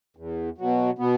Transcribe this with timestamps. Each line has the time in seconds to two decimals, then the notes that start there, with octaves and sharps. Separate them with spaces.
0.17 E2
0.58 B2 F#3
0.99 B2 B3